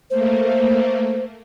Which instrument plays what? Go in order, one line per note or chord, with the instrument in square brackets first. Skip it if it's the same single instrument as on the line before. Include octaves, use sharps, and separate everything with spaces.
[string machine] A3 A#3 [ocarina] C5